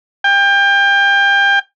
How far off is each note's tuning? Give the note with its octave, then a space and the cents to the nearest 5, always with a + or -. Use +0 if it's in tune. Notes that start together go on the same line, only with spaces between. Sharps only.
G5 +30